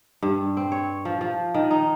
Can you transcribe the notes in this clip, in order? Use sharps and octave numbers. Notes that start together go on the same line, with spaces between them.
G2
C4
C#5
F3
F3
D#3
D#4